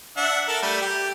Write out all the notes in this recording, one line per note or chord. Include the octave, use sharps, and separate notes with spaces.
D4 E5 F#5
A4 A#4 A5
G3 A3
G4